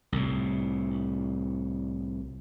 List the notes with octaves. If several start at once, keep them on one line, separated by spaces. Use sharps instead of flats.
C2 A2